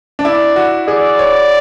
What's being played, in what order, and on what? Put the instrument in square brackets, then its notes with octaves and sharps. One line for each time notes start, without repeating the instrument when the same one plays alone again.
[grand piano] D4
[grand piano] E4 [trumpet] D5
[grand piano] F#4
[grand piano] G#4 [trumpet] D5
[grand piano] C#5